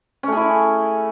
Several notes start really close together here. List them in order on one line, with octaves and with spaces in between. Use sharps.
C#4 A3 G#4 E4